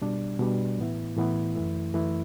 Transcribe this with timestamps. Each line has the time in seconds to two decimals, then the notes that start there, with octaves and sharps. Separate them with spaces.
0.01 B2 G3 D4
0.39 B2 G3 D4
0.78 A2 E3 B3 E4
1.17 A2 E3 B3 E4
1.55 F#2 E3 A3 E4
1.94 F#2 E3 A3 E4